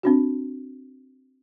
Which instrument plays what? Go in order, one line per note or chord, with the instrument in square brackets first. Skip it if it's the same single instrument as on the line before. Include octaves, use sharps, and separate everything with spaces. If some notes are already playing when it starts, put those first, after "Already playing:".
[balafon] C4 D4 F#4